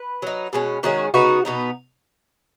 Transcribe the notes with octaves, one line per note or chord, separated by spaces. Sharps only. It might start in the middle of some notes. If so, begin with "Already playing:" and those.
Already playing: B4
F#3 D#4
B2 G#3 C#4
D#3 G#3 C#4 F#4
C#3 B3 D#4 F#4
B2 B3 D#4